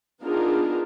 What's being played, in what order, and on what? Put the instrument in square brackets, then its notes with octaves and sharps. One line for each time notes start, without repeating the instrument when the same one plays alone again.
[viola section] B3 D4 D#4 F4 G#4 A#4